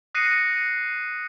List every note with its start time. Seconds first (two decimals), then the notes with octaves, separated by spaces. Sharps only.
0.15 D#6 F#6 A#6 C7 C#7 D#7